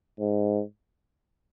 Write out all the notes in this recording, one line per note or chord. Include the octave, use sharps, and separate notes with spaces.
G#2